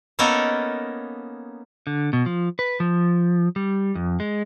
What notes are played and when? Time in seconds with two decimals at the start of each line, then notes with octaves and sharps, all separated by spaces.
0.19 A#3 B3 C#4 D#4 A4 A#4
1.87 D3
2.13 B2
2.26 F3
2.59 B4
2.80 F3
3.56 G3
3.95 F2
4.20 G#3